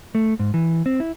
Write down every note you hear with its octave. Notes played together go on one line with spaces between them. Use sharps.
A3
G#2
E3
C4
E4